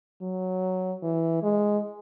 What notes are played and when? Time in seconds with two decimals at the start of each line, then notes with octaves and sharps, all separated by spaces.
0.22 F#3
1.03 E3
1.42 G#3